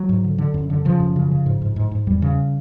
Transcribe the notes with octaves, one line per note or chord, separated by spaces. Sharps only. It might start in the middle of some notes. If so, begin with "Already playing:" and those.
Already playing: F#3
G#2
D3
D3
F#2
D3
C#3 F3
F#2
C#3
C#3
G#2
G#2
G#2
G#2
E2 G3
C#3